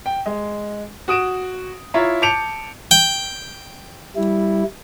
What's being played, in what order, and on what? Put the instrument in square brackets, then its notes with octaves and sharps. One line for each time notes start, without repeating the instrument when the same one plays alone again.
[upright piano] G5
G#3
F#4 D#6 D7 E7
E4 F4 C#5 A#5
A5 D6 G6 C#7 D7 F7
[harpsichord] G5
[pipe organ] G3 E4